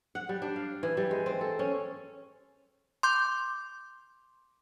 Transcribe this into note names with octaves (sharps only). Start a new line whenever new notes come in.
F#5
G3
D4
F5
E3
G3
G#3
C4
A4
C#4
C6 D6 G6